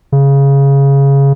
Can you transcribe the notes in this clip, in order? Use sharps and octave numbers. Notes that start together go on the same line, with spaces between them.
C#3